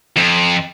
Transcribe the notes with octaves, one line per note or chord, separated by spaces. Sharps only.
F2